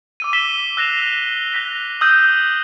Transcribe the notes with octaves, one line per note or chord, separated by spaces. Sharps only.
D6 E6 D#7
D6 E6 B6 E7 G7
E6 F#6 A#6 C7 E7 F7
F#6 A#6 B6 F7
D#6 E6 G6 D#7